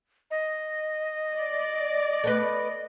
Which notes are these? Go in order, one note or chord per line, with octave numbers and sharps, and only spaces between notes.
D#5
D5
A3 B3 B4